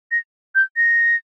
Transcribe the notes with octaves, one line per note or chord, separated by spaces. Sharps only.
A#6
G6
A#6